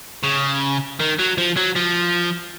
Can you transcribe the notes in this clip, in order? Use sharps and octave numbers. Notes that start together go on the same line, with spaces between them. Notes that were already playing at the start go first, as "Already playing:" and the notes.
C#3
D#3
F#3
F3
F#3
F3